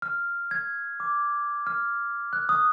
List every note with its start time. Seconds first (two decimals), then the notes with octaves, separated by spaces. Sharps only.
0.02 F6
0.51 G#6
1.00 D6
1.67 F6
2.33 F#6
2.49 D#6